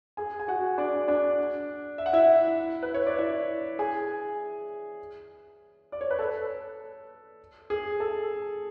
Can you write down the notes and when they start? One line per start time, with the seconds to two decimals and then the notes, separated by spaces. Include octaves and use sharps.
0.17 G#4 G#5
0.40 G#5
0.48 F#4 F#5
0.78 D4 D5
1.08 D4 D5
1.98 E5
2.06 F#5
2.13 E4 E5
2.83 B4
2.94 C#5
3.06 D5
3.18 E4 E5
3.79 G#4 G#5
5.92 D5
6.01 C#5
6.11 B4
6.19 A4
7.70 G#4
8.00 A4